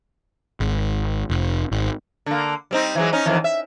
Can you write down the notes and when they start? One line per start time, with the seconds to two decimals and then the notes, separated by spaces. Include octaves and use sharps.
0.60 G#1
1.30 F1
1.71 G#1
2.26 D3 A#3
2.71 G3 C4 D#4
2.95 E3 F#3 G#3
3.13 C#4 D#4
3.26 F2 D#3 E3
3.44 E5